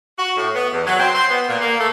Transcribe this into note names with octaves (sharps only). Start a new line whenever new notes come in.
F#4
A2
B3
E2
F#3
C4
C5
B3
A#2
A#3
A3